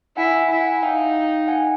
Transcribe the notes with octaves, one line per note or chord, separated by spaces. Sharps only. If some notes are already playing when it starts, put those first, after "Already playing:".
E4 F#5 G#5
E4
F#5 G#5
D#4 F5 G5
F#5 G#5